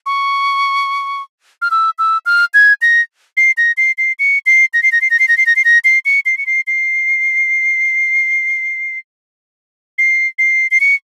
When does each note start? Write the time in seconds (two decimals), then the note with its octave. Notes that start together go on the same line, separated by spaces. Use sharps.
0.06 C#6
1.62 F6
1.71 E6
1.98 E6
2.26 F6
2.54 G#6
2.82 A#6
3.37 C7
3.57 A#6
3.77 C7
3.98 C7
4.19 C#7
4.46 C7
4.74 A#6
4.83 C7
4.92 A#6
5.01 C7
5.10 A#6
5.19 C7
5.28 A#6
5.37 C7
5.46 A#6
5.56 C7
5.65 A#6
5.84 C7
6.05 C#7
6.26 C7
6.38 C#7
6.46 C7
6.67 C7
9.98 C7
10.38 C7
10.71 C7
10.80 C#7